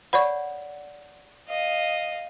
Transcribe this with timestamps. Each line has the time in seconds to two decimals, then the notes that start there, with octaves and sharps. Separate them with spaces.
0.13 C#5 D5 F#5 B5 C#6
1.48 D#5 F5